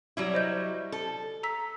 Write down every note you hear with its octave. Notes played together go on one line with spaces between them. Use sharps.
F#3 G3 E4
C5 D#5 G6
A4
A#5 E6 B6